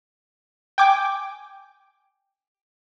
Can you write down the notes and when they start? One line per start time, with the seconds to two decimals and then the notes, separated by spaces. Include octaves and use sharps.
0.78 G5 G#5 D6